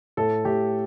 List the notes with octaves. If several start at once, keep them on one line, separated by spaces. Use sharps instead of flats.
A2 A4
A2 G4